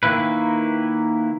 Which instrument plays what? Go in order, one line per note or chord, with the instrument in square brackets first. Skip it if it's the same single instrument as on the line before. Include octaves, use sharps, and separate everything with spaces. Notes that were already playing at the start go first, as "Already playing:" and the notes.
[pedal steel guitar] D#3 A#3 E4 B4